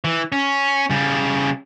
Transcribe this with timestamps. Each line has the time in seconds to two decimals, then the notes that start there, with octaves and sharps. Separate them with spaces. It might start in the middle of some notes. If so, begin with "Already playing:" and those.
0.04 E3
0.32 C#4
0.90 C#3 G3